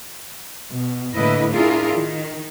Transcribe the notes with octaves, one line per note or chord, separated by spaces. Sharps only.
B2
A2 D3 A#3 E4 B4 D#5
D4 E4 F4 G#4 A#4
D#3